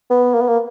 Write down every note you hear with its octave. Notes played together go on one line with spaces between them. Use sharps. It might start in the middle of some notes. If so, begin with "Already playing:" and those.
B3
A#3
B3
A#3